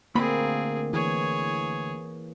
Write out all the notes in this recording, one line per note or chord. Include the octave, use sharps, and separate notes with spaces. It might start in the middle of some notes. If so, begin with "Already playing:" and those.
D2 A#3 C4 G#4 B5
E3 G#4 C#5